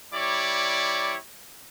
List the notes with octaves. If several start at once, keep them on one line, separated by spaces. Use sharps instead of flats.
G3 E4 C#5 D5 D6